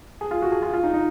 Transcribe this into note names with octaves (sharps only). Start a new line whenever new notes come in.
G#4
F4
F#4
G#4
F4
F4
D#4
D#4